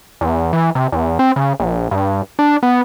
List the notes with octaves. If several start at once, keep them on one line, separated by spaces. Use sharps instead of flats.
E2
E3
C3
E2
C4
C#3
A#1
G2
D4
B3